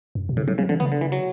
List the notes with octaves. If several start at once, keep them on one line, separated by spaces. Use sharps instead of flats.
F#2
B2
A2 C#3
A2 F#3
C#3 F#3
D3 E3
C#3 B3
D3
E3
F#3